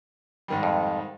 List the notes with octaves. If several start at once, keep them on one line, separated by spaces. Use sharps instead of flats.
G#2 D#3 G3
F2